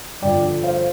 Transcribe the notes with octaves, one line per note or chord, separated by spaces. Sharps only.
G2 D3 F3 D5 G5
C5 F5